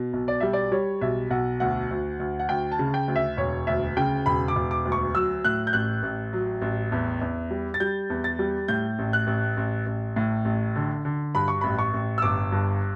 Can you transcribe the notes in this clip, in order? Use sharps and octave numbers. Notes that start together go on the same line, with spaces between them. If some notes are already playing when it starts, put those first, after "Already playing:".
Already playing: B2
B1
D5
G3 E5
D5
G3 C#5
B1 E5
B1 F#5
D2 F#5
D2
D2
F#5
D2 G5
A5
C#3
G5
D2
E5
E1 C#5
D2 E5
C#3 G5
E1 B5
D6
E1
D6
D2
C#6
F#3 E6
A2 F#6
G6
A1 F#6
A1
F#3
A1
E2
E2
G3
A6
G3 G6
E2
A6
G3
A2 G6
A1
F#6
A1
A1
A1
A2
A1
D3
D3
G2 B5
C#6
A1 B5
C#6
A1
E6
G1 D6
G2